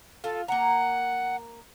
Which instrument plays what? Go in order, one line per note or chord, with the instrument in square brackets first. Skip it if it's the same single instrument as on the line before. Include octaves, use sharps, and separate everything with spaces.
[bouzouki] F4 [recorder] A4
[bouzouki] A#3 A#5 [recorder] F#5